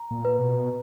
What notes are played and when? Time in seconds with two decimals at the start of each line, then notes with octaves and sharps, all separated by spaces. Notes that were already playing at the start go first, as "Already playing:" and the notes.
Already playing: A#5
0.11 A#2
0.25 B4
0.39 B2